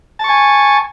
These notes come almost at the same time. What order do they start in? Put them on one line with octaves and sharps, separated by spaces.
A5 C#6 G#5